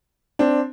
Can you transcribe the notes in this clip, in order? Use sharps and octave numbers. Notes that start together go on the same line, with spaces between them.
C4 D4